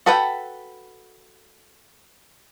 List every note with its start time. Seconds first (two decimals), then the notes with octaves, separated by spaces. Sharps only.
0.06 F#4 A4 B4 F#5 G5